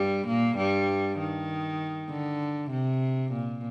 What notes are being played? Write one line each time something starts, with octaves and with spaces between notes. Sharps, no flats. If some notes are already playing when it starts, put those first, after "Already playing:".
Already playing: G2 G3
A#2 A#3
G2 G3
D#3
D3
C3
A#2